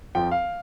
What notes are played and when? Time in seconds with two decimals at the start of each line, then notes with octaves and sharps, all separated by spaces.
0.15 F2 F3 C4 G5
0.31 F5